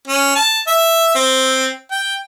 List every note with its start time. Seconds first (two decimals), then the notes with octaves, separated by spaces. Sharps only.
0.08 C#4
0.35 A5
0.67 E5
1.15 C4
1.91 G5